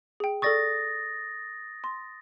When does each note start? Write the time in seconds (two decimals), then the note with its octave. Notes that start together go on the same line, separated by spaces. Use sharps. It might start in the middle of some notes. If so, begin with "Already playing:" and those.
0.20 G#4 G5
0.42 A4 D5 C#6 D#6 A6 A#6
1.84 C6